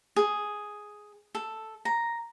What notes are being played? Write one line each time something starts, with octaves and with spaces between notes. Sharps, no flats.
G#4
A4
A#5